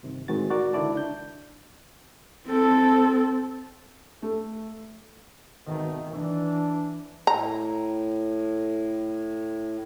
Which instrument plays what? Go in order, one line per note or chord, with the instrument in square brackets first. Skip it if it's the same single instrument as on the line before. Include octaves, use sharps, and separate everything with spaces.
[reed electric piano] G2 C3 D#3
A2 D#3 G#3 C4 F#4 A6
F#4 A#4 D5 A6
C#2 D3 D#3 E4 D5 A5
D4 G6
[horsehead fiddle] C4 A4
[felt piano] A3
[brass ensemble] G#1 B2 A3 [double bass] D#3
[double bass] E3 [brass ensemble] D4
[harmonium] A2 [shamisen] A#5